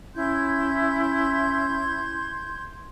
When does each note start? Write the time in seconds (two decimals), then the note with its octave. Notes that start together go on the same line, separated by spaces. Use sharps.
0.16 C#4 E4 C6 G6 G#6